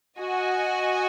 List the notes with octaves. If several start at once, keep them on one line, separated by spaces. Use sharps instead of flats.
F#4 D#5 G#5